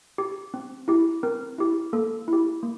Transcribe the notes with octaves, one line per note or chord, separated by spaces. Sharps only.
G4
C4
E4 G4
C4 A#4
E4 G4
A#3 A4
E4 G4
A#3